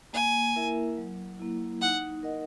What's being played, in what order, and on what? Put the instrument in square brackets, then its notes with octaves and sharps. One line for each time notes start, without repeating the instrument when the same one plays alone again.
[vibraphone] A#3 [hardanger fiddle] G#5
[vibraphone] E4 A#4 E5
F#3
A#3 E4
[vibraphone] D#4 [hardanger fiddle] F#5
[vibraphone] A#4 D#5 F#5